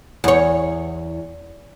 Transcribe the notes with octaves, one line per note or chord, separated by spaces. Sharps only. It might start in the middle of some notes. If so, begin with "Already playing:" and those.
E2 C#5